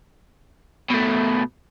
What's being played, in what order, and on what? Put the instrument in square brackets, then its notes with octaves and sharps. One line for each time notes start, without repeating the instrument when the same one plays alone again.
[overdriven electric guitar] B2 A3